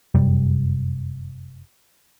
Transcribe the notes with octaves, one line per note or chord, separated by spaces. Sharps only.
F1 F#2 C3 G3